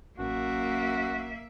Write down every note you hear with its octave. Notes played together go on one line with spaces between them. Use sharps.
A1 F#2 A#3 F#4 E5